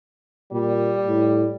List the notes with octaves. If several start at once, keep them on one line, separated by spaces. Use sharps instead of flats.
A#2 G3
A2